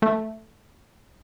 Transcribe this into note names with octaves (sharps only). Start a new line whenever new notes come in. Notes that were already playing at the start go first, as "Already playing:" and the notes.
A3